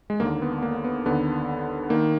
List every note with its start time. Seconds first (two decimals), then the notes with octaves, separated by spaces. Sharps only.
0.10 G#3
0.20 D#2 D3 A#3
0.42 B3
0.63 A#3
0.84 B3
1.06 D#2 D3 B3
1.90 D#3 A#3